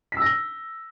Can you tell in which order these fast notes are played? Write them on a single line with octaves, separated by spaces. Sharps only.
B6 E6 A#6 G7